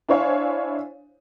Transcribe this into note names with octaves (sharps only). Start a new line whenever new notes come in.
D4 E4 C5 C#5 F5 G#5